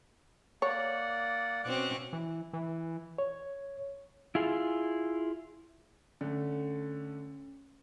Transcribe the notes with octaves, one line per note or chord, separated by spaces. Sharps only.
A#3 C#5 D5 F#5
B2 C4 C#4 D6 F#6
E3
E3
C#5
E4 F4 G#4
D3 A3 C#4